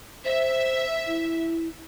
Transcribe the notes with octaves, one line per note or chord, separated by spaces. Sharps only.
C5 E5
E4